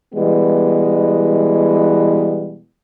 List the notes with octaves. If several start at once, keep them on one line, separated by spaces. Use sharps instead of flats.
B2 E3 G3 G#3 B3